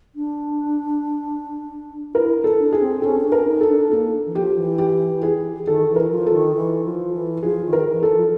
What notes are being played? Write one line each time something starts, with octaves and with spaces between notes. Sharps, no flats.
D4
E4 A#4
A4
D4
G#4
C4
C#4 A4
C#4
D4
A#4
D#4
A4
D4
A#3 A4
E3
F3 G4
E3
G4
G#4
D#3 A4
E3
A#4
F3
A4
D#3
E3
F3
E3
F3 G#4
D#3
A#4
E3
A4
E3
F3